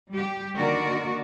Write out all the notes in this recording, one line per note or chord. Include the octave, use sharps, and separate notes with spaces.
G3 G4
D3 D#3 A#3 F#4 A#4 D5